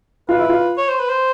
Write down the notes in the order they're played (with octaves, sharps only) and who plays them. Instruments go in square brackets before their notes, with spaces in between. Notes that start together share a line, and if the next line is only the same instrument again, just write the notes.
[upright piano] F4 [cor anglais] B4
[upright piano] E4
F4
[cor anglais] C#5
C5
B4
C5